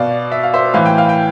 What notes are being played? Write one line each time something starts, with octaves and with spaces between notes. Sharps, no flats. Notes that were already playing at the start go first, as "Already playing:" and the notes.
Already playing: B2 D5 F5
E5
F5
C5 E5
A2 E3 F5
G5
F5
G5